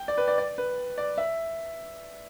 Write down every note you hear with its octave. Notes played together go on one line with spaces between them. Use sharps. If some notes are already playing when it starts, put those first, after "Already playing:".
Already playing: G5
D5
B4
D5
D5
B4
D5
E5